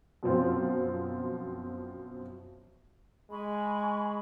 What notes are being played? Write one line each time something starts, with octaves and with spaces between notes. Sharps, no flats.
F#2 B2 F3 C4 F4
G#3 G#5 B5 C#6